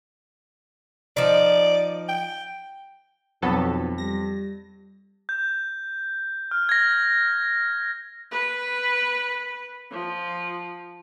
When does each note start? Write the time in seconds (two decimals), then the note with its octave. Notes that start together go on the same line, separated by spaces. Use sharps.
1.17 F3 D#4 D5
2.09 G5
3.42 B1 F2 F#3 B3 A4
3.98 G3 A#6
5.29 G6
6.51 F6
6.69 G#6 A#6
8.31 B4
9.91 F3